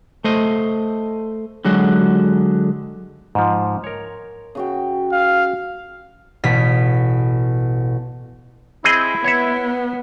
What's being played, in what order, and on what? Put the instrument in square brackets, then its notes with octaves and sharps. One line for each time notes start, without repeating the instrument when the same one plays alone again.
[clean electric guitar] A3 C5 D#5
D3 F#3 G#3 F#4
[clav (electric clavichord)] G#2 F3
A#4 C#5
[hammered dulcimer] C#3 F#4 G5
[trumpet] F5
[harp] A1 B2 B6
[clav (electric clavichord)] C4 G#4 D#5 [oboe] E4
[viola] B3 [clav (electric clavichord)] C#5 E5